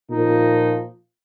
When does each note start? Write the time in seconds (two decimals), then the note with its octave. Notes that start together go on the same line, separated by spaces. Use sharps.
0.10 A#2 F3 D#4